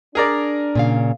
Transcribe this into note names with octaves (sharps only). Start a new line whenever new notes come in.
D4 G#4 A#4 D5
A#2 C#3 F5